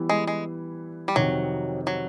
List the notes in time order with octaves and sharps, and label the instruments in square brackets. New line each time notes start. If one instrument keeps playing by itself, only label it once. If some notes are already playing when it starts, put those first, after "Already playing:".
Already playing: [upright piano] E3 G3 B3 E4
[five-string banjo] G#3
G#3
G3
[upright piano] F2 C3 D#3 [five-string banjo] F#3
[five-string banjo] F#3